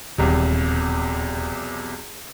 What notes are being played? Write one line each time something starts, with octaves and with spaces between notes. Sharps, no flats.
D#1 B1 E2 C3